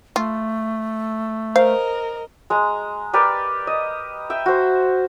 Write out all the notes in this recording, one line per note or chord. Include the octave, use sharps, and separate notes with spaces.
A3 F4
A#4 C5 D#5 F5
G#3 A#5
G4 A#4 B4 D5
D#5
E5 G5
F#4 C5